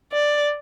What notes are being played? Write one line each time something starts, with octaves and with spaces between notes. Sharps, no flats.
D5